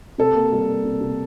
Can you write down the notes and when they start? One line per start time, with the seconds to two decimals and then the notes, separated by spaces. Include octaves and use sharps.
0.18 C3 A4
0.35 A#3
0.52 G3
0.69 A#3
0.85 C3
1.01 C3